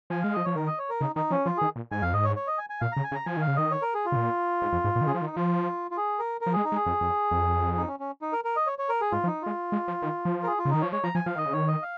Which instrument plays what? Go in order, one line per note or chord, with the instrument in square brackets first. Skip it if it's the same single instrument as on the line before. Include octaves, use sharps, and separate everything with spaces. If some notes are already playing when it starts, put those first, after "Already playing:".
[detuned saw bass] F3 [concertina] G#5
[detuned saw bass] G#3 [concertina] F5
[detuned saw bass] F3 [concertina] D#5
[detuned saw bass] F3 [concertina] C#5
[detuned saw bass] D#3 [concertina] A#4
[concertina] D#5
C#5
A#4
[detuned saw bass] C#3 [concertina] D#4
[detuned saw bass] D#3 [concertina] D#4
[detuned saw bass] F3 [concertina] C#4
[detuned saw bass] F3 [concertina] F4
[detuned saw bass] D#3 [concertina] G#4
[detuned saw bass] A#2
[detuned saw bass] G#2 [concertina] G#5
[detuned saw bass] F2 [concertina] F5
[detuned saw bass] G#2 [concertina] D#5
[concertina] C#5
C#5
D#5
G#5
G#5
[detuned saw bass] A#2 [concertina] F5
[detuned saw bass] C#3 [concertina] A#5
[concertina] G#5
[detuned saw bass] C#3
[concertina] A#5
[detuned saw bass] F3 [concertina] G#5
[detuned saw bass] D#3 [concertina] F5
[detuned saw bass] C#3
[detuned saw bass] D#3 [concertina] D#5
[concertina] C#5
A#4
G#4
F4
[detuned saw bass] C#3
A#2
G#2
F2
G#2
A#2
D#3
[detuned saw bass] C#3 [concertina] G#4
[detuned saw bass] F3 [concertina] F4
[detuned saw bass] D#3
[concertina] D#4
[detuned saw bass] F3 [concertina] F4
[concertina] F4
G#4
A#4
A#4
[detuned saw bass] F3
[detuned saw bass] G#3 [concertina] G#4
[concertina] D#4
[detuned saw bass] G#3
[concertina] G#4
[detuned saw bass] F2
F2
F2
[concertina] D#4
C#4
C#4
D#4
A#4
A#4
D#5
C#5
C#5
A#4
G#4
[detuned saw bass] G#2 [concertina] F4
[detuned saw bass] F3
[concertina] D#4
[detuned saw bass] G#3 [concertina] F4
[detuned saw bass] G#3
F3
D#3
F3
[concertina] A#4
G#4
F4
[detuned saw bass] C#3
[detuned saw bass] D#3 [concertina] D#4
[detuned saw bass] F3 [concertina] C#5
[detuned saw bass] G#3 [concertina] C#5
[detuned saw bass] F3 [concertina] A#5
[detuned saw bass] F3 [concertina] G#5
[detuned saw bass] F3 [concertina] F5
[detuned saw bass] D#3 [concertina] D#5
[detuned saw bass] C#3
[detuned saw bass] D#3 [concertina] C#5
[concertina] D#5
F5